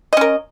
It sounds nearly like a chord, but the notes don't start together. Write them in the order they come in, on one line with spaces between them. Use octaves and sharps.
D#5 C#4 A#4